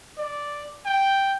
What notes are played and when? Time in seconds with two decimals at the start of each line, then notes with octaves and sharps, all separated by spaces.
0.18 D5
0.86 G5